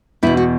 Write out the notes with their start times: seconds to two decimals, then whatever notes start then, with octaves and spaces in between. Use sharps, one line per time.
0.23 E2 B2 E4
0.37 F#4